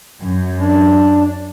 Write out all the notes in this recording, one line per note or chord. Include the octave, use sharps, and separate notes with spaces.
F#2
D4